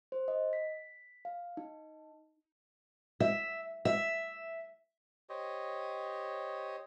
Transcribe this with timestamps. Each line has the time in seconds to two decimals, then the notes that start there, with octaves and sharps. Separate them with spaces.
0.12 C5
0.28 D#5
0.53 B6
1.25 F5
1.57 D#4
3.20 E5
3.85 E5
5.29 G4 C5 C#5 D#5